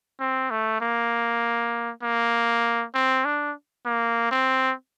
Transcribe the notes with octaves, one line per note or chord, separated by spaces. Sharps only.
C4
A3
A#3
A#3
C4
D4
A#3
C4